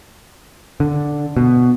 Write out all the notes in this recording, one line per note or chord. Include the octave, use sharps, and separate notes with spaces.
D3
B2